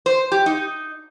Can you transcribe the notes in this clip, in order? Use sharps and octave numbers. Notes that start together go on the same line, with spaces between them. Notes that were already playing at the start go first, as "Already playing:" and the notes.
C5
G4
D#4